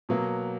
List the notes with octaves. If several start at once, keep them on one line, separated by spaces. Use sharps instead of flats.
B2 F#3 A#3